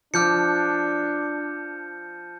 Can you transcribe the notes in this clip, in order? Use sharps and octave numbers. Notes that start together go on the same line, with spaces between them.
F3 D4 D6 F6 G6 C#7